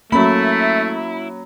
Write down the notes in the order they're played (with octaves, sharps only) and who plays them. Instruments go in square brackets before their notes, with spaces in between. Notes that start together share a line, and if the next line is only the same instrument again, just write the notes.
[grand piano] F#3 B5 [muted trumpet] A3 [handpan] A#3 C#4 [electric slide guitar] E4